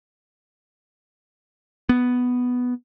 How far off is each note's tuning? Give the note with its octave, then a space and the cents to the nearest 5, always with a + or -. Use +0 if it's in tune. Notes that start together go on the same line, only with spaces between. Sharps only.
B3 +0